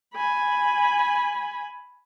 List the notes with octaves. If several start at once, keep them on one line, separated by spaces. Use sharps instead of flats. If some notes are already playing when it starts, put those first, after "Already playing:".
G#5 B5